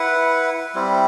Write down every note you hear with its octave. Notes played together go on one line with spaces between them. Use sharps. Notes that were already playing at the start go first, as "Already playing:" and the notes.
Already playing: E4 B4 F#5
G3 C4 E4